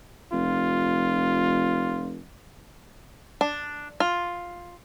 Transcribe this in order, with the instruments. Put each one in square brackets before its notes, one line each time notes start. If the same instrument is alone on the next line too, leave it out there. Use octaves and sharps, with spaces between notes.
[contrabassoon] F1 [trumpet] F4
[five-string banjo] D4
F4